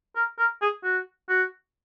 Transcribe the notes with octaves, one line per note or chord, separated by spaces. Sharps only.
A#4
A#4
G#4
F#4
F#4